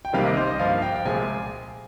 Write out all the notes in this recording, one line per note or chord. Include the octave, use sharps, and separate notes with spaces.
G5
C2 C3 D#3 G3 A#3 F5
D#5
C5
D#5
G2 F3 A#3 F5
G5
G5
C2 A#2 F3 G#3 G#5